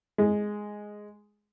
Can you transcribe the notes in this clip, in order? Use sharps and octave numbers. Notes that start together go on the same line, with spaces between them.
G#3